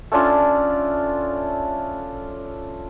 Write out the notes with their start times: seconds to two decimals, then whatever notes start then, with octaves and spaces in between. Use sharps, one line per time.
0.12 A3 C#4 D4 F4